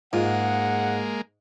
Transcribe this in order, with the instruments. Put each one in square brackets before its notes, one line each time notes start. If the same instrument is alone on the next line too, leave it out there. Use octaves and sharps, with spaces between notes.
[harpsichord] G#2 [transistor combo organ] G#3 A#3 [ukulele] F4 [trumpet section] F#5